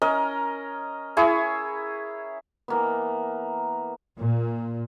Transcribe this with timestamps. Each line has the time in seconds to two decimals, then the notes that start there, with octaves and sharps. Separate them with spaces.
0.02 C#4 A#4 D#5
1.17 E4 G#4 C#5
2.68 E3 A#3 B3
4.17 A#2